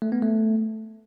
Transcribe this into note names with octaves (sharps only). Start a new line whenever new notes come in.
A3
B3
A3